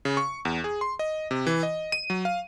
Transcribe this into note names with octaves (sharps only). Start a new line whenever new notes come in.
C#3
C#6
E2
G#4
C6
D#5
C3
E3
D#5
D#7
F#3
F5